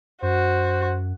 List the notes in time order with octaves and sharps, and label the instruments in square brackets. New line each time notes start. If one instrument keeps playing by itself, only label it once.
[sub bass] F#2 [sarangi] F#4 [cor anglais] C5